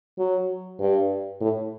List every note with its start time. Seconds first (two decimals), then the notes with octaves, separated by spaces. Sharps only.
0.18 F#3
0.80 G2
1.41 A2